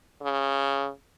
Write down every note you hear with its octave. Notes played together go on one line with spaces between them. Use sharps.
C#3